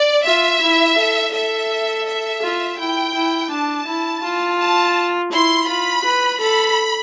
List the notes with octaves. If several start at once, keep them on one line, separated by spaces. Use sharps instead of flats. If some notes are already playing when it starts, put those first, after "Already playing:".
Already playing: D5
F4 E5
E4
A4
A4 E5
E5
F4
E4 G5
E4
D4 A5
E4
F4
A5
E4 C6
F4 B5
B4
A4 B5